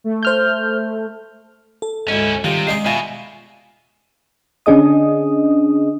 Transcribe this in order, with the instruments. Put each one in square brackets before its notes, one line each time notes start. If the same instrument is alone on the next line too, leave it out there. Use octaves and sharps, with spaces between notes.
[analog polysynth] A3
[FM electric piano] C5 F6 G6
A4
[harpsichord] D2 G#2 [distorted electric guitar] C#4 E4
[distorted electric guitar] C3 [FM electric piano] D#3 [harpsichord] G3 F4
[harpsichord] G#3 D4 D#5 [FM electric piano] C7
[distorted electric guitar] B2 [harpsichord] F4 [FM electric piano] E5 G#5
[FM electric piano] D3 C#4 D4 G#4 D#5 D#6